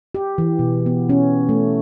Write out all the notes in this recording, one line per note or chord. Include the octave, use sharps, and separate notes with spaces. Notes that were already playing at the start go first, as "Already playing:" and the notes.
G4
E3
B2
B3
C#4
A3